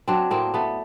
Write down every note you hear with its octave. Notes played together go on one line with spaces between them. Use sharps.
F#3 C4 D4
A2 A#3 C4
A3 B3